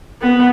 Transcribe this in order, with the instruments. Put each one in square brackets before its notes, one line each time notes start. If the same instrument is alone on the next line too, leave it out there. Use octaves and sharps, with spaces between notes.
[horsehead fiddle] B3